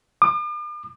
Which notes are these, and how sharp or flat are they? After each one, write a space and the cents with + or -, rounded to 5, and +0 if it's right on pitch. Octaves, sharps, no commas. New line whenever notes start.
D6 +45